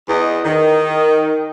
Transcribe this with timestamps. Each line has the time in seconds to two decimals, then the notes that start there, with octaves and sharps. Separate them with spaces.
0.09 E2 D#5
0.45 D#3